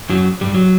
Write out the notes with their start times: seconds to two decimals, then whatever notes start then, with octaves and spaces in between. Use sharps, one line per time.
0.09 F#2 F#3
0.41 G2 G3
0.54 F#3